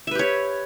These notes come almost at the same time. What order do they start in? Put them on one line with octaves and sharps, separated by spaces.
E5 B4 G4 C#5